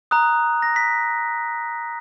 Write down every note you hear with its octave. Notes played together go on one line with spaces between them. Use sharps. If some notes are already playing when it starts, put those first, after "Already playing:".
A#5 D#6 F#6
A#6
B6